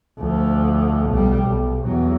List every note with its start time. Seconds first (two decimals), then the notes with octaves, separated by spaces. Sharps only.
0.19 D2 F3
1.10 B1 G3
1.44 B1
1.85 E2 F#3